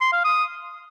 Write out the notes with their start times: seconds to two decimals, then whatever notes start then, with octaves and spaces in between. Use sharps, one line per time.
0.01 C6
0.13 F5
0.25 D#6